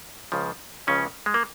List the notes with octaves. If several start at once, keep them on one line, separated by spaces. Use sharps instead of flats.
C#2 C#3 F3
C#2 C#3 F3 C#4
G#3
A#3